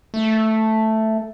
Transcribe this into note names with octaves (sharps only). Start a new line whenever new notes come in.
A3